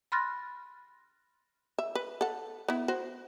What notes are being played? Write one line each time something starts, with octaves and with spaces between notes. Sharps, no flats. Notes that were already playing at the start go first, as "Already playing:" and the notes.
B5 C6 F6 F#6 A6 A#6
E5
B4
A4 F#5
B3 E4
F#4 C5